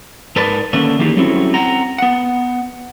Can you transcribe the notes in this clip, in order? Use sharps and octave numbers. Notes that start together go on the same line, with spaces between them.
G#2 D#4 A#4 B4 D5 A5
D3 D#3 A3 A#3 C#4 D4
D#3 E3 A#3 D#4 G4 G#4
F#3 G3 A3 C4 C#4 E4
C4 F#5 A#5
B3 F#5